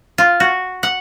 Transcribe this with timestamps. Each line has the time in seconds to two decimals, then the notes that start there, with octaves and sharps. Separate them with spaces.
0.18 F4
0.40 F#4
0.83 F#5